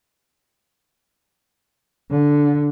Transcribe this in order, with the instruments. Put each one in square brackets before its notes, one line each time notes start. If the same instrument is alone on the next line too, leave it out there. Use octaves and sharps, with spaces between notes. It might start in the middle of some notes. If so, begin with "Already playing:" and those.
[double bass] D3